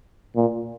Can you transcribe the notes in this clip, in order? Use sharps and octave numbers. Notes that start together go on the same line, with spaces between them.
A#2